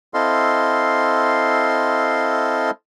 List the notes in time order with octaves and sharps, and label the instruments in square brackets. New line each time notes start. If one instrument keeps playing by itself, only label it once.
[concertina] C4 E4 A4 D#5 F5 C6